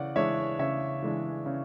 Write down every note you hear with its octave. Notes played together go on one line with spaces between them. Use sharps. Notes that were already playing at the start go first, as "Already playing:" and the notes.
Already playing: C#3 E3 D5 F#5
E3 G#3 D4 C#5 E5
C#3 C#5 E5
E3 G#3 D4
C#3